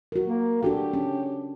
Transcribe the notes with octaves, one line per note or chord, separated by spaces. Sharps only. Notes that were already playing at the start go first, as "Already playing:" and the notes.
F#4 A#4
A#3
D4 F#4 G4 A4
C#4